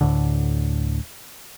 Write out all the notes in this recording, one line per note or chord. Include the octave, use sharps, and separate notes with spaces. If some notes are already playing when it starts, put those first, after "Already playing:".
D2 A2 D3